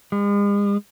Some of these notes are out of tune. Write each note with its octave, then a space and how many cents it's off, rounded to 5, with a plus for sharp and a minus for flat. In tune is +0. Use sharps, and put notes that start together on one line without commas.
G#3 -40